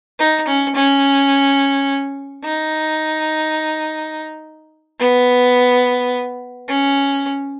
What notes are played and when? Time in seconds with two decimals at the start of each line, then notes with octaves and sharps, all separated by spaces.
0.19 D#4
0.48 C#4
0.75 C#4
2.44 D#4
4.99 B3
6.68 C#4